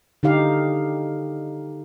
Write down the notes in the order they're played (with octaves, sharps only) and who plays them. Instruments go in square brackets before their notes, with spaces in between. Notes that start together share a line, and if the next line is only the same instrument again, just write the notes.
[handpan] D3 D#4 G4 F5